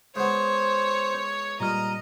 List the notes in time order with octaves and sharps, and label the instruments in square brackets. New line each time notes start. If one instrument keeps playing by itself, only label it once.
[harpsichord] G#3 B3 [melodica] C5 [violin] C#5
[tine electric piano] A#2 G3 F6 [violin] D#5 [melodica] A#5